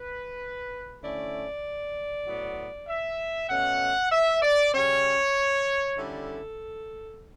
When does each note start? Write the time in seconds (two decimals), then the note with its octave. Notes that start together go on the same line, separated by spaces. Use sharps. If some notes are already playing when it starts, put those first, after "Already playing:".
Already playing: B4
1.01 D3 A3 C#4 E4 D5
2.26 A2 F#3 B3
2.87 E5
3.49 B2 A3 C#4 F#5
4.12 E5
4.42 D5
4.73 C#3 G3 C#4 C#5
5.97 D3 G3 C#4 E4 A4